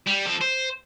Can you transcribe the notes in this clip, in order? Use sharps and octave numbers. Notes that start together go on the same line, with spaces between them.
G3
F3 A4
C5